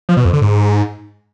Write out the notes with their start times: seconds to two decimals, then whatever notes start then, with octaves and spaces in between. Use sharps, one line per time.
0.09 F3
0.17 B2
0.25 F2
0.33 D3
0.42 G#2